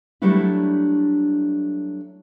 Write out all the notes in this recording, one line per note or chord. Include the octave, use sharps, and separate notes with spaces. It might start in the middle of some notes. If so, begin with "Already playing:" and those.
F#3 G3 A3 D4 E4